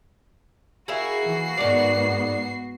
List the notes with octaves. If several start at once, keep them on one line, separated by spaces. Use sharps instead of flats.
A#3 E4 F#4 G#4 C7
E3
G#2 D#3 B3 G#4 D5